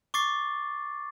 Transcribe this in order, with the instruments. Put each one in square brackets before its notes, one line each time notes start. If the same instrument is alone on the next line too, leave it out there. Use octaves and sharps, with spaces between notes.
[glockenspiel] C#6 D6 A6 C7